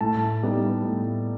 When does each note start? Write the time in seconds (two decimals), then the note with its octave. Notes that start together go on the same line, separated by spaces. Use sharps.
0.01 A2 A5
0.43 G3 B3 D#4
0.84 A2